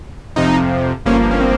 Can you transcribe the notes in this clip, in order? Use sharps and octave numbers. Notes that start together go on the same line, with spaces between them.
F2 C3 F3 D#4
G1 G2 F3 A#3 C#4
C#4
C4